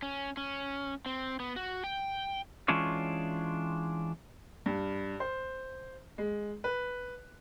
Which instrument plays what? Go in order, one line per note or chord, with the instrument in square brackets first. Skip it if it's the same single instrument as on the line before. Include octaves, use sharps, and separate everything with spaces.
[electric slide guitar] C#4
C#4
C4
B3
F#4
G5
E3 G#3 C#4 D4 F4 C#5
[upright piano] G2
C5
G#3
B4